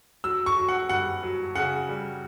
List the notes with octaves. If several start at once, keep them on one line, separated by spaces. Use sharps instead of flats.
F#3 E6
C#6
F#3
F#5
G2 F#5
F#3
C#3 F#5
G3